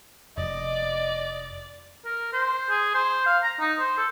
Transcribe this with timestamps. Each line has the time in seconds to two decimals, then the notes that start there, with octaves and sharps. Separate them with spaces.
0.37 F1 D5 D#5
2.05 A#4
2.33 C5
2.70 G#4
2.94 C5
3.26 F5
3.43 A#5
3.60 D#4
3.79 C5
3.97 A4